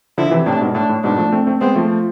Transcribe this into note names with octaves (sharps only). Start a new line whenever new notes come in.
D3 F3 E4
C3 E3
A2 C3 D4
G#2 B2
A2 D4
A2
G#2 B2 D4
F3 A3
A3 C4
A3 C4
G#3 B3 C4
F3 A3